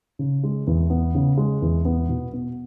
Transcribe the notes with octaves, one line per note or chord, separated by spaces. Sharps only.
C#3
G#3
E2
B3
C#3
G#3
E2
B3
B2
B3